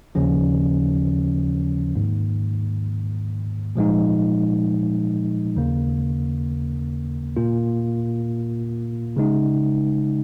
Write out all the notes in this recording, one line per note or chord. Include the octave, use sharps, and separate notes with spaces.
D#2 C#3 F3 C#4
G#2 D#3 A#3
A#2 F3 G#3 D#4
D#2 C#3 A#3
A#2 A#3 F4
C#3 G#3 D#4